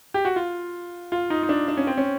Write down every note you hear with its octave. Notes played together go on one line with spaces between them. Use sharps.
G4
F#4
F4
F4
D#4
D#4
D4
D4
C#4
C4
C#4